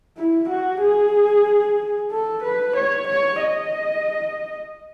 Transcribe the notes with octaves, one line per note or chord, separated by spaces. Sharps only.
E4
F#4
G#4
A4
B4
C#5
C#5
D#5